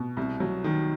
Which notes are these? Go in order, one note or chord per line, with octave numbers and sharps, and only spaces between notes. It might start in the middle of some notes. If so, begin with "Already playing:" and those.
Already playing: B2
C2
F#3
D#3